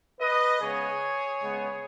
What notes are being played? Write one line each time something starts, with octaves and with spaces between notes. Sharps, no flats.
B4 D#5
C#3 G#3 B3 G#4 C#5
C#3 G#3 B3